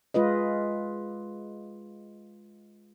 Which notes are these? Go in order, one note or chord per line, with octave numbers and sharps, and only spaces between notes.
G#3 F4 B4 D#5